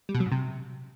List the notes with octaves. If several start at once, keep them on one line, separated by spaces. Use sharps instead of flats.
G3
B2
F#3
G#2
C3